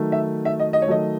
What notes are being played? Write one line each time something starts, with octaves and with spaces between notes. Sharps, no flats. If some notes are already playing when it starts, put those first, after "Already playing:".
Already playing: D#3 F#3 A3
E5
E5
D#5
D#5
C#5
D#3 F#3 A3 D#5